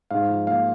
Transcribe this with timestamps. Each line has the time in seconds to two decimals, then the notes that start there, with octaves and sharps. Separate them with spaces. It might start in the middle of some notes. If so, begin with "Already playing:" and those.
0.11 G#2 F5
0.29 F3
0.47 A#3 F5